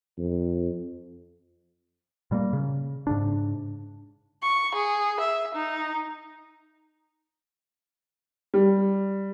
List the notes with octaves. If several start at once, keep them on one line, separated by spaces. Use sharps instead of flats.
F2
A#2 G3 G#3 A#3
C#3
G#2 C#3 D4
C#6
G#4
E5
D#4
G3